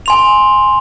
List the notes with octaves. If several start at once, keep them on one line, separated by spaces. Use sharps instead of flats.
G#5 C6 F7